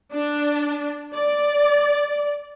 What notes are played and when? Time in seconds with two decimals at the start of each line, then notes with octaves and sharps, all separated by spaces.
0.12 D4
1.14 D5